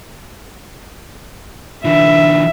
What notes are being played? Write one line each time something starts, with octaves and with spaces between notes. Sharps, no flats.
D3 E3 E5